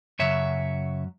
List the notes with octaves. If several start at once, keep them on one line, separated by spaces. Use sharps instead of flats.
F#2 C#3 F#3 C#5 E5